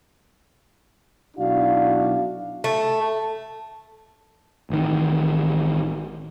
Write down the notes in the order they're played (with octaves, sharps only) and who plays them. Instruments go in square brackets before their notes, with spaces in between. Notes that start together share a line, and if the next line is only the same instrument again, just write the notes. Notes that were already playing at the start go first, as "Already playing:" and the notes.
[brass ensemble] B1 D4 E4 F#4 F5
[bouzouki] A3
[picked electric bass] A1 D#3